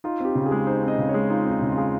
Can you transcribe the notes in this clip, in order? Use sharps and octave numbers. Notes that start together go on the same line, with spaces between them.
D#4 F4
C4 G4
C#3
G#4
G#3
D#4 C5
C4
D#5
C#3
C#5
G#3
D#4 F4
C4
D#4
C#3
F4
G#3